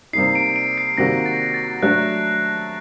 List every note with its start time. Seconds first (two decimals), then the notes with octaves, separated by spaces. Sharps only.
0.13 C3 G3 A#3 D#4 C7
0.35 D7
0.56 D7
0.78 C7
0.97 C3 D#3 G3 A#3 F#4 A#6
1.26 A6
1.54 A6
1.82 F#3 A3 D4 A4 F#6